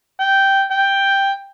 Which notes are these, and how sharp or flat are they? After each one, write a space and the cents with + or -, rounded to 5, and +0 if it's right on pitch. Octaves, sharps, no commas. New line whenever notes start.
G5 -5
G5 +5